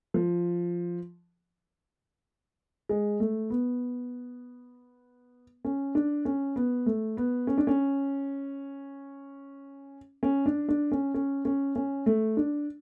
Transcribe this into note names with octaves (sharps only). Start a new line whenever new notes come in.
F3
G#3
A3
B3
C#4
D4
C#4
B3
A3
B3
C#4
D4
C#4
C#4
D4
D4
C#4
C#4
C#4
C#4
A3
D4